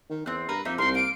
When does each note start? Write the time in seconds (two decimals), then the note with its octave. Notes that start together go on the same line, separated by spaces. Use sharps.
0.10 D#3
0.26 E2 C4 F#6
0.49 G2 A#4 B4 A#5
0.65 F2 A#3 D#4 E5
0.78 C2 D#4 A#4 C6
0.95 A#3 F5 D7